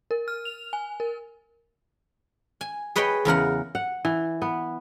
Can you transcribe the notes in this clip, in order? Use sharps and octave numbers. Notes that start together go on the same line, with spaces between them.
A#4
F6
F7
G#5
A#4
G#5
G#4 B4 C#5 D#5 G5
E2 C#3 A#4 F#5
F#5
E3
B3